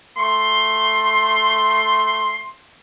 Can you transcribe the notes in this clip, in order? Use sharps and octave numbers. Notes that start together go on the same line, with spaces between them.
A3 C6